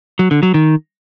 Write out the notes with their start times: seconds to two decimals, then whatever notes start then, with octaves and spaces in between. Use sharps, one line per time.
0.19 F#3
0.31 D3
0.43 F#3
0.54 D#3